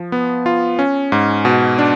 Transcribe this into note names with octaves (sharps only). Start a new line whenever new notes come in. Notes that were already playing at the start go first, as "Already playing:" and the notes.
Already playing: F3
B3
F4
C#4
G#2
B2
D4